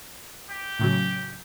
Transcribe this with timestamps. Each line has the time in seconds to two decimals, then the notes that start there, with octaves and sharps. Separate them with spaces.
0.50 G4
0.79 A2 C#3 F#3